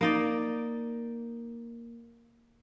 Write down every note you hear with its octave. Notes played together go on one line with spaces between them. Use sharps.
A#3 D#4 D5